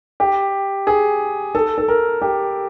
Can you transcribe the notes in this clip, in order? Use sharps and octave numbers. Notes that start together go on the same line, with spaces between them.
G4
G#4
A4
A4
A#4
G4